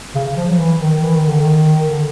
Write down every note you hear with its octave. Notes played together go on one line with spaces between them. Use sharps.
C#3
F3
F#3
E3
D#3
E3
D#3
D3
D#3
D3